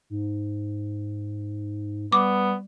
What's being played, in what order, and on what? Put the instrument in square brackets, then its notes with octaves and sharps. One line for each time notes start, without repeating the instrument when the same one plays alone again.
[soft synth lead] G#2
[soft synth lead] G3 [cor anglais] B3 [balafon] D6